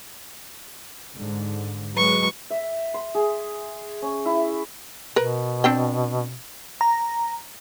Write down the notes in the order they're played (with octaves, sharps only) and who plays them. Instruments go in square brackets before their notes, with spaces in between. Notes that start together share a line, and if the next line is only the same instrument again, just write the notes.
[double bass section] G#2 D3
[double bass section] F#3 G#3 [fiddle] B4 C#6
[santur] E5
C6
G#4
C#4
E4
[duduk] B2 [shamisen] A#4 B4
[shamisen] C4 D4 G5
[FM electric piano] A#5